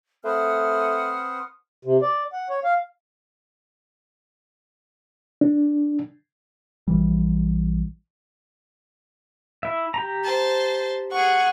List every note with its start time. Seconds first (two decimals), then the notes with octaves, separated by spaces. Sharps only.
0.25 A3 C4 B4 C5 F#5 D#6 F6
1.85 C3
2.02 D5
2.33 F#5
2.49 C#5
2.64 F5
5.41 D4
6.88 A#1 E3 G3
9.63 E4 E5
9.94 G4 A#5
10.23 C5 A5
11.12 G#4 F#5 C#6